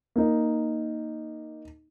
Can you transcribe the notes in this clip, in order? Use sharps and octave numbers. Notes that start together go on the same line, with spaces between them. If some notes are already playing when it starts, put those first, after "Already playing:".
A#3 D#4